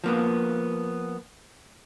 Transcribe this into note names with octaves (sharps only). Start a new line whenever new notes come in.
F3 A#3 B3